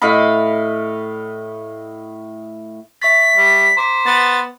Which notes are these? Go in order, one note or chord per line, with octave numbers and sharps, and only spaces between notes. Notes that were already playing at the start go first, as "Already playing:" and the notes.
A2 D#5 F5 B5
E5 C#6 A6 B6
G3
C5 A#5 D6 B6
B3 A6